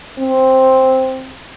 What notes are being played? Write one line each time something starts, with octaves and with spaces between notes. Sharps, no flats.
C4